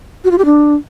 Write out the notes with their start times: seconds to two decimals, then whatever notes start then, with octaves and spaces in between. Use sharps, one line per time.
0.24 F#4
0.31 F4
0.38 G4
0.45 D4